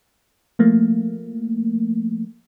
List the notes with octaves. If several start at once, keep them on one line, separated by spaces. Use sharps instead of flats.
F3 A3 A#3